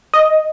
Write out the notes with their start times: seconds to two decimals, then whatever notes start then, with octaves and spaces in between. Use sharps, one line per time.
0.14 D#5